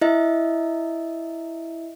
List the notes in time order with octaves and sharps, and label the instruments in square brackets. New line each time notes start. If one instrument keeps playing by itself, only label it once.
[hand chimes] E4 D#5 E5